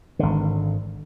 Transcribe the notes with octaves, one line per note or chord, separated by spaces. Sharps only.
G#1 D3